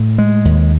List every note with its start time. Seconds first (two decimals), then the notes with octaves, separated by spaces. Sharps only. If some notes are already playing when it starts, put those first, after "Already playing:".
Already playing: A2
0.18 G#3
0.45 D#2